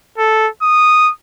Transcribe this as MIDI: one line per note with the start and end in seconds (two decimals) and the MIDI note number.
0.18 0.48 69
0.62 1.11 87